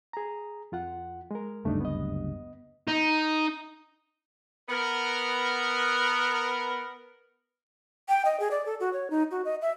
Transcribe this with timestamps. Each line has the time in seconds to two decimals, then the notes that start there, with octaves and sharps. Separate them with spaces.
0.13 G#4 A#5
0.72 F2 F4 F#5
1.31 G#3 A#4
1.65 F#1 D2 G2 A3 D4 D#4
1.80 B3 D#5
2.88 D#4
4.69 B3 A#4
8.08 G5
8.25 D#5
8.40 G#4
8.51 D5
8.66 A4
8.80 F#4
8.93 C#5
9.10 D#4
9.31 F#4
9.45 D#5
9.62 E5